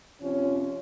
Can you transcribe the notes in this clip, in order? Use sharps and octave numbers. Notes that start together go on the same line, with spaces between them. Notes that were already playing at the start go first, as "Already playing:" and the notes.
F2 C3 F3 C#4